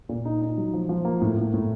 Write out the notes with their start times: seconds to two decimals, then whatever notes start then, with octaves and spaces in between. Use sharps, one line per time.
0.09 A#2
0.25 D#4
0.42 D#4
0.58 F#3
0.73 F3
0.89 F3
1.05 A#3
1.21 A2
1.37 A2
1.54 A2